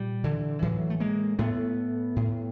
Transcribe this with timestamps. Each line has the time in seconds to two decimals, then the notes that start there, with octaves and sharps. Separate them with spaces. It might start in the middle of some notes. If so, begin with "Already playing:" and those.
Already playing: A#2 G3
0.24 D3 E3
0.62 A2 E3 F#3
0.90 A3
1.00 G#3 A#3
1.39 A2 A3 B3
2.16 A2